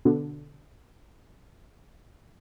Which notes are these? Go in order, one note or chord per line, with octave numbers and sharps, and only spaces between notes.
B2 D3